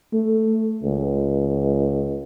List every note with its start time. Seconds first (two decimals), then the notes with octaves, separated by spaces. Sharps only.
0.13 A3
0.83 C#2